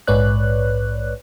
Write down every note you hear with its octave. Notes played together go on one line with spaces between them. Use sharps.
A#1 G#2 B4 C#5 D5 F#6